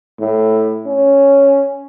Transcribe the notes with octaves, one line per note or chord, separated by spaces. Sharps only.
A2
C#4